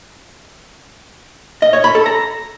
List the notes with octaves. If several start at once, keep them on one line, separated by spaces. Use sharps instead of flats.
D#5
C#5
B5
A4
A#5